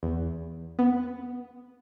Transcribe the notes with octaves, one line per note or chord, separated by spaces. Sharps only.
E2
B3